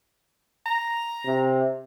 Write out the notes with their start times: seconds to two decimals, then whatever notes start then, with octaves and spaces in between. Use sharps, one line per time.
0.66 A#5
1.26 C3